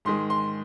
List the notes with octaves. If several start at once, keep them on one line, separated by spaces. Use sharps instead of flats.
G#2 D#3 G#3 C6
C6